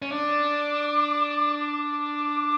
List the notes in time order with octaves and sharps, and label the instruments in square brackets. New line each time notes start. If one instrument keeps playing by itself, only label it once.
[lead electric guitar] C#4
[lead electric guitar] D4 [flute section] D6
[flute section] D6